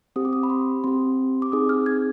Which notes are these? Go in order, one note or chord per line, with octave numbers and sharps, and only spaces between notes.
C4 G4 D#6
D6
D#6
B5
C6
C4 G4 C6
D6
C4 D#4 G#4 D#6
F6
G#6